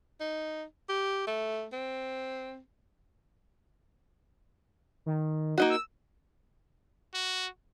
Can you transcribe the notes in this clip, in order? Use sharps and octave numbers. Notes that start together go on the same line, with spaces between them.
D#4
G4
A3
C4
D#3
A#3 D#4 F#4
E6
F#4